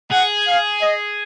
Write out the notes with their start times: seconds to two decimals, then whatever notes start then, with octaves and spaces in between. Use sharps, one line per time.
0.12 G#4 F#5
0.47 F5
0.82 D#5